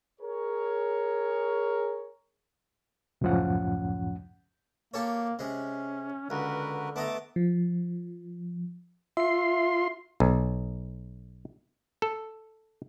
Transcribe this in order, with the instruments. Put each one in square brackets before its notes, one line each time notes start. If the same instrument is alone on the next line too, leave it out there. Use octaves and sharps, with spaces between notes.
[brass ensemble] G#4 A#4 C#5
[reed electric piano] C#2 F#2 A2 F3 C#4 F#5
[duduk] A#3 [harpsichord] G4 A4 C#5
[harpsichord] C3 G#3 [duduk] C#4
[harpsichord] C#2 [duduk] D3 [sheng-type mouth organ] F#4 A#4 B4
[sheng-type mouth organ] A3 A5 D6 [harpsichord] B3 D#5 A#5
[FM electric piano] F3
[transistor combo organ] F4 C6 [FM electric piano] E5 C7
[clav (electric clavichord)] B1
A4